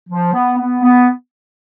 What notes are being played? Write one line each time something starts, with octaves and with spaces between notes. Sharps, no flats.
F3
B3
B3
B3